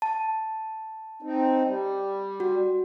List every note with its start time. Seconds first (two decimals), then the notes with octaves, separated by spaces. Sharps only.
0.02 A5
1.22 C4 D#4
1.65 G3
2.40 F#4